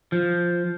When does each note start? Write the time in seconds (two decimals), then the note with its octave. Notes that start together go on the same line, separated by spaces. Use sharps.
0.12 F3